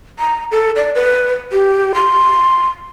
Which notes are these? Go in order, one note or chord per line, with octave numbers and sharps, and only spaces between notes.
A#5
A4
D5
B4
G4
C6